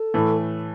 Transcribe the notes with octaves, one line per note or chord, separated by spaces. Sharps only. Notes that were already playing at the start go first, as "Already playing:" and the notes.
Already playing: A4
A2 E3 A3